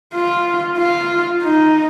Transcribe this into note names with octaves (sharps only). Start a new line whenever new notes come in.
F4
F4
D#4